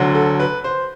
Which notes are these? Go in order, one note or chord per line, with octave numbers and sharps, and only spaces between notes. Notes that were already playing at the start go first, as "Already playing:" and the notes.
Already playing: D2 D3 F#3
A4
B4
C5